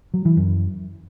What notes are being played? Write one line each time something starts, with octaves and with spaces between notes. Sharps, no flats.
F#3
E3
F#2